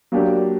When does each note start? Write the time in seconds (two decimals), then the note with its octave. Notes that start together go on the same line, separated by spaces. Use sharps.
0.12 F#3 A#3 D4 G4